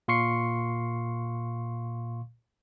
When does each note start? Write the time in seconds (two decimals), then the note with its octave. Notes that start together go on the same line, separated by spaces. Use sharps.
0.08 A#2 F5 C6 C#6 C7 C#7